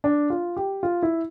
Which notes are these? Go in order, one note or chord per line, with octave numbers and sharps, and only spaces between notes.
D4
F4
G4
F4
E4